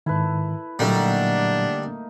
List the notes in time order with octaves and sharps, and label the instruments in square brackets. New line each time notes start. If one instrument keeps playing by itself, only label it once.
[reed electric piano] G#2 D#3 [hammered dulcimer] E4 A4 B4
[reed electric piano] A#2 F#3 [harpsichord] D3 G3 [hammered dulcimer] A3 A#3 D#4 [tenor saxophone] D4